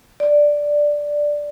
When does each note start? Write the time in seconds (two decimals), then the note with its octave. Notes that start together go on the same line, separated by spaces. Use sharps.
0.20 D5